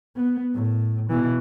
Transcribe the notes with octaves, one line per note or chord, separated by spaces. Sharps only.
B3
A2
B2 E3